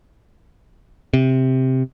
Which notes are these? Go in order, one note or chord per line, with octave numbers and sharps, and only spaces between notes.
C3